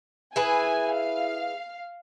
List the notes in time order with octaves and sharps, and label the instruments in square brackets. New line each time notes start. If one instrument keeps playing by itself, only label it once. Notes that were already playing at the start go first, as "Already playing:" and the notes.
[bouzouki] E4 G#4 B4 [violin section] G#5
[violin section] F5